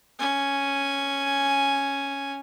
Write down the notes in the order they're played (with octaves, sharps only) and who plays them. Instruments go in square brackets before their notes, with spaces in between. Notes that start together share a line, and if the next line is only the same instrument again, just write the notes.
[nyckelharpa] C#4 G#5